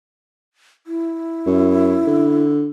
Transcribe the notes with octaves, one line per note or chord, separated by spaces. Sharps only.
E4
F#2
D3